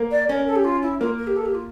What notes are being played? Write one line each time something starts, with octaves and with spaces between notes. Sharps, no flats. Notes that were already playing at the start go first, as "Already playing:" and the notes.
Already playing: A#3
D5
C#4 A#4
A4
G4
F4
E4
A#3 F4
A#4
G4
A4
G4
F4